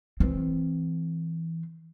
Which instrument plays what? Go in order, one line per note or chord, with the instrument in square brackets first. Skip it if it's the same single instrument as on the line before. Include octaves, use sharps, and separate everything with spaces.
[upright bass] E3 C4